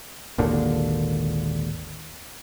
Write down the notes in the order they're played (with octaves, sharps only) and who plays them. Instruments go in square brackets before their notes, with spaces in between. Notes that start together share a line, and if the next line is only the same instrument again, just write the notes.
[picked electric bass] G#1 D#2 A#2 D3